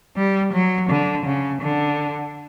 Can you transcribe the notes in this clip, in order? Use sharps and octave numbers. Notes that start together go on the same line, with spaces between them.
G3
F#3
D3
C#3
D3